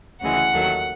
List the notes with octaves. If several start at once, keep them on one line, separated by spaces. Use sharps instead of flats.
D2 C#3 E3 G#3 F#5
D#2 D#3 F#3 A3